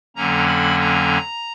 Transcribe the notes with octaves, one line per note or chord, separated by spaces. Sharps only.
F2 D3 F#3 A#3 C#4 A#5
B5
A#5